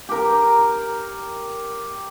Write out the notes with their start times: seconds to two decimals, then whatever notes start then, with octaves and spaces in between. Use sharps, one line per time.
0.09 G4 A#4